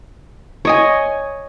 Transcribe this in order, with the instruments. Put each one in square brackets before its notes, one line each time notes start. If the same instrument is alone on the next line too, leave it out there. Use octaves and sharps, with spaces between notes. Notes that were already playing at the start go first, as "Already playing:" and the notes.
[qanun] C#5 D#5 G#5